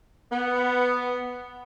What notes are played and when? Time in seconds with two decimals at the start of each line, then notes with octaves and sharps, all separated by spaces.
0.31 B3